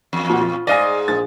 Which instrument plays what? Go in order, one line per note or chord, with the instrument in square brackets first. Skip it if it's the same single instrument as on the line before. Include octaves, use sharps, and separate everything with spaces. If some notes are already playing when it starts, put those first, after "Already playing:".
[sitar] E2
[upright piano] A#2 F#4
F4
[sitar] G#2 F#4 D#5 [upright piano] D5 F5 G#5
[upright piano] A#1 A6